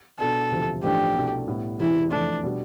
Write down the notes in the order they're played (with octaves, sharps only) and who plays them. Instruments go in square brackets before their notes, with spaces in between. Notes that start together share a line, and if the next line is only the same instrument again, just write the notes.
[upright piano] B2 B3 D4 [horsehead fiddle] A4
[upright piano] E1 D2 C3 F3
[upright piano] A1 G2 F3 A3 D4 [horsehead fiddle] G4
[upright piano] C2 B2 A3 D4 A4
A2 G3 B3
[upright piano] E1 E2 C3 [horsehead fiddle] E4
[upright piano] F2 E3 A3 [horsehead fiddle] D4
[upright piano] B2 G3 D4